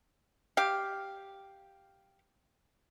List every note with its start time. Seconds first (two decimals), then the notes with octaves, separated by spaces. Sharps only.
0.57 G4 F5